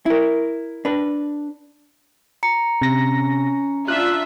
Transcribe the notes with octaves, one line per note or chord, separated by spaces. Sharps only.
E4 A#4
D4 B4
A#5 C#7
C3 C#4 A#6
D4 F4 E5 F#6